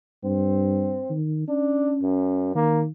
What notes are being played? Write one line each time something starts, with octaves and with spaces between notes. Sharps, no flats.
G2 C4
D#3
C#4 D4
F#2
D#3 A#3